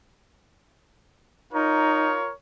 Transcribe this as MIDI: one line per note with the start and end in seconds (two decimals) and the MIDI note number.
1.53 2.16 63
1.53 2.32 65
1.53 2.32 70
1.53 2.32 73